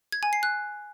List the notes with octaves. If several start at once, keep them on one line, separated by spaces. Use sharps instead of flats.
G#6
G#5
C7
F#6